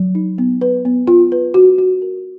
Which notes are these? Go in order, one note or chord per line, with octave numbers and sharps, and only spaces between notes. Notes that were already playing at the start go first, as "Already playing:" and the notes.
Already playing: F#3
D#4
B3
B4
B3
F4
B4
F#4
F#4
A#4